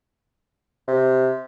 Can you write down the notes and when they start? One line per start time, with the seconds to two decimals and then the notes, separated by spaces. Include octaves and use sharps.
0.88 C3